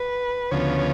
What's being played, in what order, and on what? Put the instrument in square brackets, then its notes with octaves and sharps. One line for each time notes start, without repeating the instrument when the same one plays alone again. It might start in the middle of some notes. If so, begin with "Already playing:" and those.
Already playing: [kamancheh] B4
[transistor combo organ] D2 C#3 F3 B3 [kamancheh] C#5